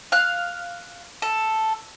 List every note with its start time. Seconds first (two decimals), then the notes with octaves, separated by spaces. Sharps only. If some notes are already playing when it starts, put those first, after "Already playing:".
0.12 F5 F#6
1.22 A4